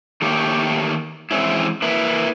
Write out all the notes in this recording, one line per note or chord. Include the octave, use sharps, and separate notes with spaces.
D#3 A3 A#3 G4 C#5
E3 G#3 C4 C#4 E4
A#3 E4 B4